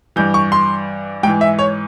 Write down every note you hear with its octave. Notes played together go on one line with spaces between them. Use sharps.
G2 E3 G6
C#6
C6
G#2 E3 G5
E5
C#5